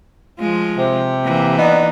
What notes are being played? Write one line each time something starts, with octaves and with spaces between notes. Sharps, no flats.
F3 G#3 F4
C3
E3 A#3
B3 D4 D#4